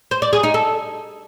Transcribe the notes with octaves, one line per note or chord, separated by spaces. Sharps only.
C5
D5
G#4
D#4
A4